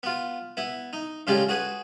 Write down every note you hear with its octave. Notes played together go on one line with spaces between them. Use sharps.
B3 F4
B3 E4
D#4
A2 C#3 G#3 F4 G4 D5
F#4 G#4 B4 D#6